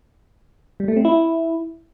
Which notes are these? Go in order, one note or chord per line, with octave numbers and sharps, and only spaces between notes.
G3
A3
C4
E4